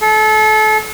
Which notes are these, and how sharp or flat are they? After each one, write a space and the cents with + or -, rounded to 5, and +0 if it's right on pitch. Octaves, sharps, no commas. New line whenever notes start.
A4 -30